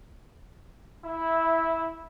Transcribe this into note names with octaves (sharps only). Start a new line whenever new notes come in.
E4